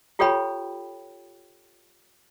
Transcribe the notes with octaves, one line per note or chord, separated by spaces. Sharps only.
F4 G4 A4 C#5 G5 B5